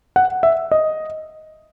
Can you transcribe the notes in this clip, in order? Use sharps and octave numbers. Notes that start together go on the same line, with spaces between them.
F#5
E5
D#5